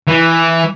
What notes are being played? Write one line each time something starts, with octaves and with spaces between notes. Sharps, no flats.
E3